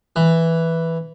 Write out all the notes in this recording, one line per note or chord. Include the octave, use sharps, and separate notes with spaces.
E3